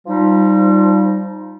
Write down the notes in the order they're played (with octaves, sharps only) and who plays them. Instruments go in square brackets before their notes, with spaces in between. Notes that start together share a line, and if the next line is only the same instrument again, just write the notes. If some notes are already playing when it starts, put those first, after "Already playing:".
[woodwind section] F3 G3 D#4 F4